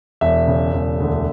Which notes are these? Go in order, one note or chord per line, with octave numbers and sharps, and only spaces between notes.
E1 E5
C#3
E1
D2